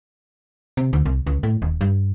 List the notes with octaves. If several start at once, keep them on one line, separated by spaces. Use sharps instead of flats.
C3
D2
C2
C#2
A2
D#1
G2